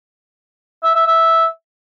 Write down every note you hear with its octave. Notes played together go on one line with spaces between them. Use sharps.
E5
E5
E5